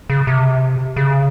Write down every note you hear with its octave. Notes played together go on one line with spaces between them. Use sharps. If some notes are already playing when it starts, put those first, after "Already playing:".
C#3
C3
C#3